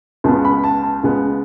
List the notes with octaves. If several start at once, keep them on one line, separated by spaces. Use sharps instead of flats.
C#2 C#3 G#3 B3 A5
B5
A5
A5
C#2 C#3 G#3 B3